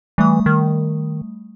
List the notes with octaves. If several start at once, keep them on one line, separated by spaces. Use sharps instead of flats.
E3 G3 A3 D#6
D#3